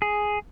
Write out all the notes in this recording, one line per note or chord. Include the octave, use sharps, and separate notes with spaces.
G#4